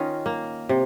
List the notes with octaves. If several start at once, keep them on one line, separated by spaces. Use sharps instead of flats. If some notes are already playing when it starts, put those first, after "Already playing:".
Already playing: D#3 C#4 D#4 F4
A#3
C3